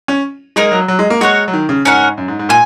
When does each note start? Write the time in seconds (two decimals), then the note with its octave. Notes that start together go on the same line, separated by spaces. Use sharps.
0.08 C#4
0.56 G#3 A#3 D#4 A#4
0.72 F#3
0.88 F#3
0.99 G#3
1.10 A#3
1.21 G#3 F#4 A#4 C#5 F#5
1.48 F#3
1.53 D#3
1.69 C#3
1.85 G#2 C#4 A#4 F#5
2.18 F#2
2.28 G#2
2.39 G#2
2.49 A#2 G#5